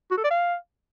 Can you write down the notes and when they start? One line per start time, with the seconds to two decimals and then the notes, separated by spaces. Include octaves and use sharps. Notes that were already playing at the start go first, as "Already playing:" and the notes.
0.11 F#4
0.18 A4
0.24 D5
0.31 F5